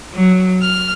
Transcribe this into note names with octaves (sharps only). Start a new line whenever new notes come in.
F#3
F6